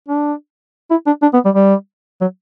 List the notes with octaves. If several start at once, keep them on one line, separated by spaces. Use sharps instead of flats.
D4
E4
D4
D4
B3
G3
G3
F#3